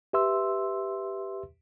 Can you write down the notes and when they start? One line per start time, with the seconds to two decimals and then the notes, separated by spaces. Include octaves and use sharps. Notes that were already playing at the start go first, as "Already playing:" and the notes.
0.13 G4 B4 E5 C6 E6